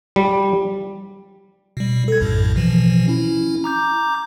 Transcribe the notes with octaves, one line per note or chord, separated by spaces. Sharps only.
G3
B2 G3
A4 G#6
A#1 F#2 A2
B2 E3 F3
C#4 E4
A#5 D6 G6